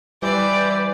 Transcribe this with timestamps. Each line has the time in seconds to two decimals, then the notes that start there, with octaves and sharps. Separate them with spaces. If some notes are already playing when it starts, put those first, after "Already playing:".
0.23 E3 G3 G4 B4 C5 D5